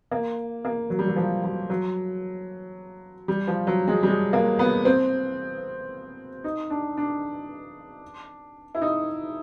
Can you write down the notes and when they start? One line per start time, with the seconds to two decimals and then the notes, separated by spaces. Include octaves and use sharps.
0.12 A#3
0.65 A#3
0.90 F#3
0.99 G3
1.08 F#3
1.16 F3
1.43 F3
1.70 F#3
3.28 G3
3.48 F3
3.67 F#3
3.88 G#3
4.03 G3
4.07 G#3
4.33 A#3
4.59 B3
4.85 C4
6.44 D#4
6.70 D4
6.97 D4
8.75 E4
8.82 D#4